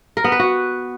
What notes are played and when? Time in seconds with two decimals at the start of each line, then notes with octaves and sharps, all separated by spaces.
0.17 A#4
0.24 B3
0.32 B4
0.40 F#4